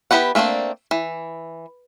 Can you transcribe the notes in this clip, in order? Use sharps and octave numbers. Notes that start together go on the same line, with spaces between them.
B3 E4 G4 B4 F#5
A3 A#3 C4 D4 D5
E3